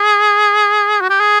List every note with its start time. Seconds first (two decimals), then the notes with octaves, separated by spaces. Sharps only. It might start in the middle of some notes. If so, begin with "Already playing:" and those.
Already playing: G#4
1.01 F#4
1.10 G4
1.20 G#4